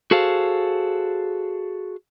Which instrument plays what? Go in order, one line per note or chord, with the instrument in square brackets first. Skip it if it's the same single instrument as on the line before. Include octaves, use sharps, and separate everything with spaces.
[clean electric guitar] F#4 G#4 A4 C5 F5